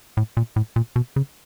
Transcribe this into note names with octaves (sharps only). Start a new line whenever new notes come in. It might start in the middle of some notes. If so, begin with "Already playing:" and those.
A2
A#2
A2
A#2
B2
C#3